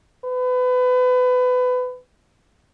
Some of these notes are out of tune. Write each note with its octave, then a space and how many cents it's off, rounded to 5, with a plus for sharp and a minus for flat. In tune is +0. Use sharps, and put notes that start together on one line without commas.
B4 +25